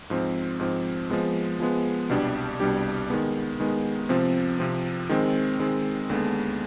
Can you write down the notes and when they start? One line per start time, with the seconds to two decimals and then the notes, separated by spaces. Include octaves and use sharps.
0.10 G#2 F3 C4
0.60 G#2 F3 C4
1.10 F3 G#3 B3
1.60 F3 G#3 B3
2.09 C2 B2 G3 D4 G4
2.60 C2 B2 G3 D4 G4
3.10 D#3 G#3 B3
3.60 D#3 G#3 B3
4.09 C3 F3 C4
4.59 C3 F3 C4
5.09 D#3 G#3 C4
5.59 D#3 G#3 C4
6.10 D#2 D3 G#3 B3